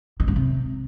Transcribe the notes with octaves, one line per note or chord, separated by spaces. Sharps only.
D#3
G2
C3